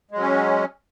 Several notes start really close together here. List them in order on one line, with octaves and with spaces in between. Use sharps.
G#3 F#3 C#4